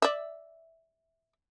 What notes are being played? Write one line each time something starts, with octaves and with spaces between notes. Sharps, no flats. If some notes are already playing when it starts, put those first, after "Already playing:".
D5 E5